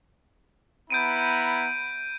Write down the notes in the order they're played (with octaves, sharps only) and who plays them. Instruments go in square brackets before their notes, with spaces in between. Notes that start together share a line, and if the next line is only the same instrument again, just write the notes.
[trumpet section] B3 E4 A#5 [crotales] G6 D7 D#7